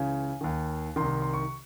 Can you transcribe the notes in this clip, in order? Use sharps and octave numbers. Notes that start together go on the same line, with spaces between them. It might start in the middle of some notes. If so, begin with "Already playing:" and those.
Already playing: C#2 C#3 E3 G#5
D#2 D#3
C2 C3 D#3 C6
C6
C#6